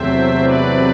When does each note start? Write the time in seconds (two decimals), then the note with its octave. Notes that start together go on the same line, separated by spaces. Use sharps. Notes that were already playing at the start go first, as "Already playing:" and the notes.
Already playing: E2 C3 F#3 A3 C4 C5 E5
0.41 B4 D5